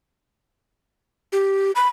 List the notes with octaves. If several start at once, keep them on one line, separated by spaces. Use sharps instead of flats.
G4
B5